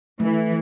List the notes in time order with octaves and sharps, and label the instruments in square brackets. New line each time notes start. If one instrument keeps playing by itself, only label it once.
[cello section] E3 [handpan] A3